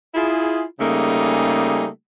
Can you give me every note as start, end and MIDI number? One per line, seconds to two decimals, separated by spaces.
0.14 0.63 64
0.14 0.63 65
0.14 0.63 68
0.80 1.87 49
0.80 1.87 55
0.80 1.87 57
0.80 1.87 58
0.80 1.87 63
0.80 1.87 68